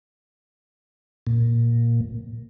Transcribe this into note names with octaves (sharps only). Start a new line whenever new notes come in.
A#2